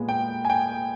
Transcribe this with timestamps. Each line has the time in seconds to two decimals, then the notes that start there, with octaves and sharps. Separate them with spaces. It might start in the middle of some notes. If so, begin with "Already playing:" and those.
Already playing: A#2 G#3 B3
0.09 G5
0.45 G#5
0.50 G5